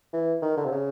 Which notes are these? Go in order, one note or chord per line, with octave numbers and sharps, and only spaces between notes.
E3
D#3
D3
C3
C#3